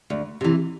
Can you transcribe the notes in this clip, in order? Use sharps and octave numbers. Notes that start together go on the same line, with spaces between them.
D2
C3 E3